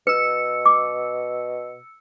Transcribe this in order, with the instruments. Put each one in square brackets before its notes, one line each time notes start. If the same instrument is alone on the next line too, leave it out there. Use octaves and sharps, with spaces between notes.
[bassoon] B2 [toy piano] B4 [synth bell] E6 C#7
[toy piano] D6